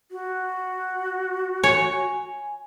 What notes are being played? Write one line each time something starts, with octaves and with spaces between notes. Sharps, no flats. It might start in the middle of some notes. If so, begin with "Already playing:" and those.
F#4
C#5 G#5